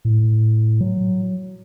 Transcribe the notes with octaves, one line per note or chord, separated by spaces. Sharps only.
A2
F#3